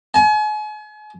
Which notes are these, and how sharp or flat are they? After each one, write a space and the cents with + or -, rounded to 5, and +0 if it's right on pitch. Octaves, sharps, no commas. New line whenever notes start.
G#5 +40